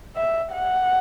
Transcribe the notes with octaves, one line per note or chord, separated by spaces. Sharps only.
E5
F#5